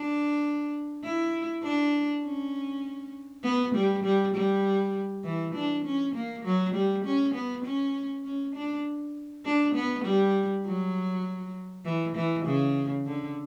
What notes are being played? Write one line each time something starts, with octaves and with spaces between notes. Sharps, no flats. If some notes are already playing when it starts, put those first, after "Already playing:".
Already playing: D4
E4
D4
C#4
B3
G3
G3
G3
E3
D4
C#4
A#3
F#3
G3
C#4
B3
C#4
C#4
D4
D4
B3
G3
F#3
E3
E3
C#3
D3